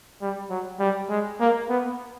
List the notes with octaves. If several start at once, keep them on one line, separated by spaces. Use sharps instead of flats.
G3
F#3
G3
G#3
A#3
B3